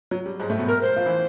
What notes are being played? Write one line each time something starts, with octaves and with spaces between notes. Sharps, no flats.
F#3
G3
G#2 G#3
A2 A3
B2 B3
A#4
C5
F3 F4
E3 E4